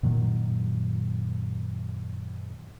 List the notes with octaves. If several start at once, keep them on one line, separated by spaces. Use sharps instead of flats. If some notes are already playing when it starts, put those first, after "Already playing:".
F#2 A#2 D#3 F#3